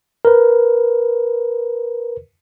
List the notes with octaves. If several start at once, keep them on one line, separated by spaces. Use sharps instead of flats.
A#4 B4